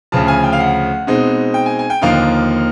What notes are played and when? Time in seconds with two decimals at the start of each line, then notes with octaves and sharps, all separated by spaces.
0.12 D2 C#3 F3 A5
0.28 G#5
0.44 G5
0.53 F5
0.60 F#5
1.07 B2 G#3 C4 D#4
1.54 G5
1.66 G#5
1.79 G#5
1.90 G5
2.02 D#2 D3 F3 A#3 D#4 F5